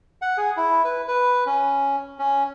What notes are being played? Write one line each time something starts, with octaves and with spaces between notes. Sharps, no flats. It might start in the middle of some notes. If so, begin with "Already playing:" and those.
F#5
G#4
E4
B4
B4
C#4
C#4